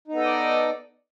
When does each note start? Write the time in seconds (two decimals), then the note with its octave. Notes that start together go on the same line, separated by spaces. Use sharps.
0.08 D#4
0.12 B3
0.16 A4
0.20 D#5
0.24 D5